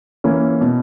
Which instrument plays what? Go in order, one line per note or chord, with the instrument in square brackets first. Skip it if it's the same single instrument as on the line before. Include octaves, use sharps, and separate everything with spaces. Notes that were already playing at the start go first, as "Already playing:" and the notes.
[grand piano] E3 A#3 C#4
B2